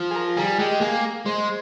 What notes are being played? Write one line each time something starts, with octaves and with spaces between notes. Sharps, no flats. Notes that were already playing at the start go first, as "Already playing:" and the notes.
Already playing: F3
G#4
A#4
G3 G#4
G#3 G4
A#3 G#4
G#3 C5